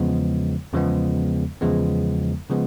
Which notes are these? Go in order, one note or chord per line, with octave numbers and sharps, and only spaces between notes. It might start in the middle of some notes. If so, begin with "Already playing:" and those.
Already playing: E2 C#3 F3 G#3 B3
E2 C#3 F3 G#3 B3
E2 C#3 F3 G#3 B3
C#3 F3 G#3 B3